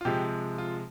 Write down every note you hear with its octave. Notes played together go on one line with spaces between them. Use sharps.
F4
C3 F3 G#3 G4
F4